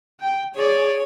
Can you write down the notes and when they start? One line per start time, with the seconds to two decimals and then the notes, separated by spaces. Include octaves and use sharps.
0.20 G5
0.55 G#4 C#5 D5